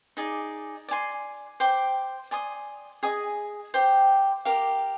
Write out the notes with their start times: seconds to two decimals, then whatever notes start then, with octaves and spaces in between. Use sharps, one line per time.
0.17 D#4 G#4 D5
0.88 D5 G#5 C6
1.60 C5 G5 D6
2.31 D5 G#5 C6 D#6
3.03 G#4 D#5 G#5 D#6
3.74 G4 C5 G5
4.45 G4 A#4 F5